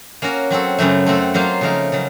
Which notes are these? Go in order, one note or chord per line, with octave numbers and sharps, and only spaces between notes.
A#3 C#4 F#4 A#4
F#3 C4 F#4 A4
F#2 C#3 F#3 A3
A3 C4 F#4 A4
F#3 A#3 F4 C5 F5
C#3 F3 A3 D#4 A#4
C#3 F#3